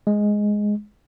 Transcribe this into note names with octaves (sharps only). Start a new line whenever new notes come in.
G#3